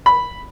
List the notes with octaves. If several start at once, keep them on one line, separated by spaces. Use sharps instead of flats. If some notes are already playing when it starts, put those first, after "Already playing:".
B5